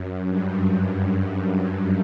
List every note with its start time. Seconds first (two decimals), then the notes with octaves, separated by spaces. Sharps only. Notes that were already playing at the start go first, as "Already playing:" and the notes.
Already playing: F#2
0.29 G2